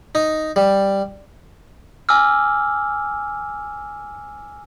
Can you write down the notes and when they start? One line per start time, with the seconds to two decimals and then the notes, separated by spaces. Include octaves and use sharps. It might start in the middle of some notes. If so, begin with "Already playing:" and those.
0.15 D#4
0.56 G3
2.09 G#5 D6 E6 F6